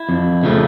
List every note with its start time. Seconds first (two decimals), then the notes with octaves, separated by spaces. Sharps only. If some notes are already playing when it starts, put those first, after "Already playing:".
Already playing: E4
0.09 F2
0.43 C#3 F3 A3